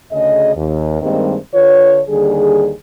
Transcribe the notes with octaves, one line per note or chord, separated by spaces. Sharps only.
D2 C#3 G#4 D#5
D#2
G2 D#3 G3 G#3 A#3 C4
D3 F4 B4 C#5
D#2 D3 G3 G#4